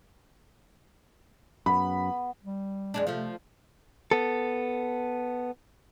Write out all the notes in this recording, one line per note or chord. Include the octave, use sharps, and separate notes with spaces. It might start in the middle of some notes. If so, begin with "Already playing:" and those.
F#2 B3 B5
G3
F2 G#3 D4
C3 F3 A3
B3 A4